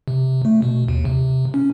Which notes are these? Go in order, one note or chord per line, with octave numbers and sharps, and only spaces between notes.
C3
A3
B2
D#2
C3
C#4